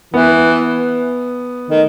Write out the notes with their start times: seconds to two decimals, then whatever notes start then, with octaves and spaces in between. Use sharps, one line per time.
0.14 E3 B3
1.71 D#3 A3